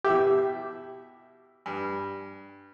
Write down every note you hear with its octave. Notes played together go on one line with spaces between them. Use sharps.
B2 E4 G4 E5
G2